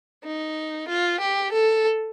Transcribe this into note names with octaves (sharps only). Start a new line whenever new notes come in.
D#4
F4
G4
A4